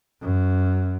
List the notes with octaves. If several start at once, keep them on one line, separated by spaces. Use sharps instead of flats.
F#2